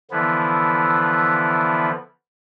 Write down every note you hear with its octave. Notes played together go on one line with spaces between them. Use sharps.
D3 E3 F3 B3 E4